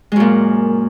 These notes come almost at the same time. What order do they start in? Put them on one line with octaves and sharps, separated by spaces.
G#3 F#2 A#2